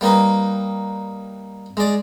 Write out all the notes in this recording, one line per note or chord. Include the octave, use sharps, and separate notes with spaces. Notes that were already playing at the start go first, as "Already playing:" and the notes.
G3 A#3 D#4 B4
G#3 D5